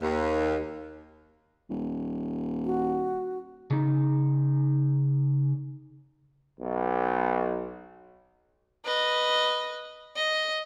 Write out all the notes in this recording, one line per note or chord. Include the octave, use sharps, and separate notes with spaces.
D#2
D#1
F#4
C#3 D#4
B1
B4 D#5
D#5